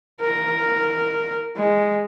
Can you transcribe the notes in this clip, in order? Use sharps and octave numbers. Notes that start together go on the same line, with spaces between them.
A#4
G#3